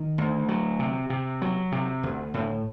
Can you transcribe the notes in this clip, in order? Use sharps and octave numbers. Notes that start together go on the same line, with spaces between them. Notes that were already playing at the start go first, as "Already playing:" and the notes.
Already playing: D#3
D2
F#3
C3
C3
F#3
C3
D2
A2